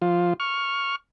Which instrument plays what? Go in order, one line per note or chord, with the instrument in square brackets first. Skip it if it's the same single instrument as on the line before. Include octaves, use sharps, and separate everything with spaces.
[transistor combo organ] F3 F4
C#6 F6